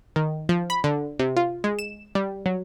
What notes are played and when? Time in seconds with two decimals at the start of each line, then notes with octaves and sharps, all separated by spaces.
0.16 D#3
0.49 F3
0.70 B5
0.84 D3
1.19 C3
1.37 F4
1.64 G#3
1.79 E7
2.15 G3
2.46 F#3